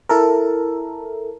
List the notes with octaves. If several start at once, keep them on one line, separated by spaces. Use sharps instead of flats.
E4 A4 A#4